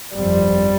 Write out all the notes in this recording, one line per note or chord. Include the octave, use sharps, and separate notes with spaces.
G1 F2 F3 G3 C4